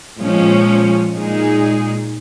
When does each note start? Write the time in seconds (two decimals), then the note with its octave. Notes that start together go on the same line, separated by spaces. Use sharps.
0.18 A#2 F3 G#3 C#4
1.13 A#2 G#3 D#4 G#4